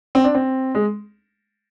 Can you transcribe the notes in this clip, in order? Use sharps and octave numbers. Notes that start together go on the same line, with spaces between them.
C4
D4
C4
G#3